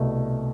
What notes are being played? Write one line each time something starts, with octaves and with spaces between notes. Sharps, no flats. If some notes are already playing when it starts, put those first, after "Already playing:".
Already playing: C2 B2 A3